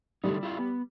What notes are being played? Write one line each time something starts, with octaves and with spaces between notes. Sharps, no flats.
D3 G3 A3 D#4
E4 F4 G4
B3